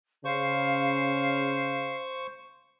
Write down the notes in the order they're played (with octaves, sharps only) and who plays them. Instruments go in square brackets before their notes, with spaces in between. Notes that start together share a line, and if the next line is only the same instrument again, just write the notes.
[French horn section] C#3 [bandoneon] C5 C#6 [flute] F5